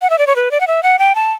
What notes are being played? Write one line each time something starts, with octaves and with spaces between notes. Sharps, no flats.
F#5
E5
D5
C#5
B4
D5
F#5
E5
F#5
G5
A5